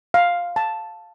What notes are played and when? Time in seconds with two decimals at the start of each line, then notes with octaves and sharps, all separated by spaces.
0.14 F5
0.56 A5